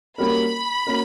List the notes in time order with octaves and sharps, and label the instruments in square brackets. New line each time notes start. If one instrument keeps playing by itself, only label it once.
[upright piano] G3 A#3 C#4 F#4 A#4 [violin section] B5
[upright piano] A#3 C#4 F#4 A#4